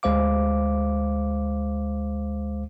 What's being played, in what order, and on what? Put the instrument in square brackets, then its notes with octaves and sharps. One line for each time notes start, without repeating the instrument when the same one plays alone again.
[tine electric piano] D2 G#3 C5 F5 D6